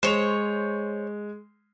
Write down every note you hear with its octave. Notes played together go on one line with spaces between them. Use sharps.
G#3 C5 C#5 F7